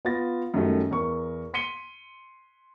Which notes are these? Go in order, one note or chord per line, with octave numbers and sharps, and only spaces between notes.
B3 F4 B4 A6 A#6
F#2 D#3 F#3 G3 A3
E2 A#4 C#6
C6 B6 C#7 D#7 G7